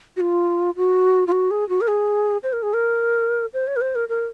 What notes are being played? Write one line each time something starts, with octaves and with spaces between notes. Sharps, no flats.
F#4
F4
F#4
F4
F#4
G#4
F#4
A#4
G#4
C5
A#4
G#4
A#4
C5
C#5
A#4
C5
A#4
A#4